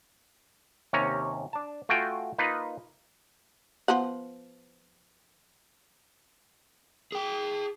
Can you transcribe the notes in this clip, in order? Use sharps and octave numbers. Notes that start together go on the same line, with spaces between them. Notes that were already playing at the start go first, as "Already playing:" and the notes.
D#2 C3 C#4 C#5 A#5
D4 A5
A3 F4 F#4 G5 G#5
A#3 D#4 F4 B4 D#5
F3 B3 F#5
G#4 G5